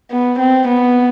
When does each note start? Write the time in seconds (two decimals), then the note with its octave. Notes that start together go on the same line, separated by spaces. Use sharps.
0.11 B3
0.39 C4
0.68 B3